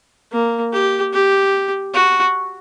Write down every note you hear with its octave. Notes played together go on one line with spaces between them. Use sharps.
A#3
G4
G4
F#4